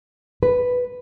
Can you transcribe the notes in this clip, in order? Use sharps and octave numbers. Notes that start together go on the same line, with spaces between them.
B4